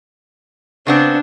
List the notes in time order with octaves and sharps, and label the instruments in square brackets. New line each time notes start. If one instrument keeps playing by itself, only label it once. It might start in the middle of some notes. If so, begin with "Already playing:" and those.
[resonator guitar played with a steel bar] C#3 B3 C4 [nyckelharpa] D4